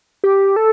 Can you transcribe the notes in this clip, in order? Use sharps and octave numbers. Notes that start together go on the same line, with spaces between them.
G4
A4